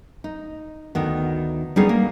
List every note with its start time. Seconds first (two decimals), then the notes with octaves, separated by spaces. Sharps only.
0.24 D#4
0.95 D2 D#3 B3
1.76 G3 B3 C#4 D#4 G#4
1.89 A#3